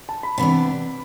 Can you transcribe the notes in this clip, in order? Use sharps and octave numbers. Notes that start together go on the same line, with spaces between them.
A5
B5
C3 E3 B3 D4 B5